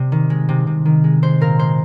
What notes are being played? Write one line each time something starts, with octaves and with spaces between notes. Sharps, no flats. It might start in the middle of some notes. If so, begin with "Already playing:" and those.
Already playing: C3 G3
D#3
G#3
C3
C3
D#3
G#3
G#3 C5
A#2 A#4
G#3 C5